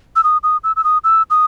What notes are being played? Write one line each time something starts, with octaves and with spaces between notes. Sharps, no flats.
E6
D#6
D#6
E6
E6
D#6
E6
D#6